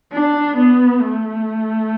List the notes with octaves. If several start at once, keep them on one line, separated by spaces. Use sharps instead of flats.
D4
B3
A3